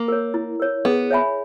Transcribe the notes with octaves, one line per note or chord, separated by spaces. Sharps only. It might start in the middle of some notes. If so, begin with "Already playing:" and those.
Already playing: A#3
A#4 C#5
E4
A#4 C#5
B3 G#4
C#5 E5 G#5 B5